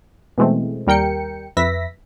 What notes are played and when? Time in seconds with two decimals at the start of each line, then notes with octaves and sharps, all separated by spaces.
0.38 B2 E3 G#3 A3 C4
0.87 D#2 G3 A#4 G5 C#7
1.57 F2 B4 E5 A#6 B6